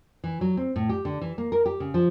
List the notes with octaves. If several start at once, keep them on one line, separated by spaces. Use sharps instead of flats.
E3
F#3
C4
A2
G4
D3
E3
A#3
A#4
G4
C#3
F3